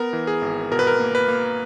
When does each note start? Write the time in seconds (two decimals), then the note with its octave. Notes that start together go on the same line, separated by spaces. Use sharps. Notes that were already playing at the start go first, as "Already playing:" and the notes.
Already playing: B3 A#4
0.13 E3
0.27 G#4
0.42 G#1
0.72 B2 A#4
0.79 B4
0.87 A#4
1.00 A#3
1.15 B4
1.28 A#3